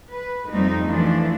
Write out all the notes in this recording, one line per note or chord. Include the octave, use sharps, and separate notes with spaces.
B4
F2 G3 A3 C4 D#4
E3 F3 A3 D4